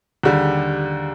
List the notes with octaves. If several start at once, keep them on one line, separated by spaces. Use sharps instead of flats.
D#2 D3 G3